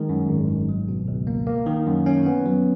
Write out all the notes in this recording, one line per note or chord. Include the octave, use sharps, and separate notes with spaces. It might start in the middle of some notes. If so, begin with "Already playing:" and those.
Already playing: D#3 G#3
F#2
G#1
G#1
F#3
B2
C#2
A#3
A#3
D#3
F#2
C#4
B3
F#3